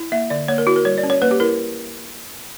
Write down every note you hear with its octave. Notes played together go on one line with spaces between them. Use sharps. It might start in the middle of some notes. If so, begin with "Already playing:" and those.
Already playing: E4
A#3 E5
D3 D5
A#3 C#5
A#4
E4 F#4
A#4
G3 C#5
D5
C#4
C#5
A#3 B4
G4
E4 A#4